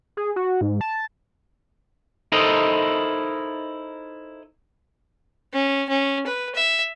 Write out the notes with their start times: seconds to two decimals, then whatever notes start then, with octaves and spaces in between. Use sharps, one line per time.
0.17 G#4
0.36 F#4
0.61 G#2
0.81 A5
2.32 D#4 E4 A4 A#4 C5 D#5
5.53 C#4
5.89 C#4
6.27 B4
6.55 E5